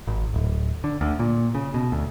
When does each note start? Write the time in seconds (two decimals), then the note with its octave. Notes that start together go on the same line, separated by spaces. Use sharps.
0.07 G#1
0.34 D1
0.84 D3
1.01 D2
1.19 A#2
1.55 C#3
1.74 B2
1.92 D2